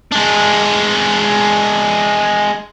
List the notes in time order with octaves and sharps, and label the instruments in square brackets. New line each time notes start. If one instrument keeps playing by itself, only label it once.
[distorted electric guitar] G#3 D4